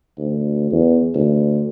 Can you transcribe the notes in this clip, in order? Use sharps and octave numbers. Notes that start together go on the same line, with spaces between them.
D2
E2
D2